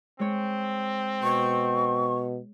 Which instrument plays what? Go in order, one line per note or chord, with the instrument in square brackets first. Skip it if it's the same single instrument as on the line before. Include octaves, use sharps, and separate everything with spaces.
[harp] G#3 C#5 [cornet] C4
[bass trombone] B2 [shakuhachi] C#6